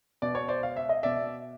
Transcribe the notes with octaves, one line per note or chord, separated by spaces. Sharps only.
B2 D5
C#5
C5 D5
F5
E5
D#5
B2 D5 E5